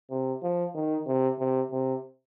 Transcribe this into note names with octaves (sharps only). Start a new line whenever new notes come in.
C3
F3
D#3
C3
C3
C3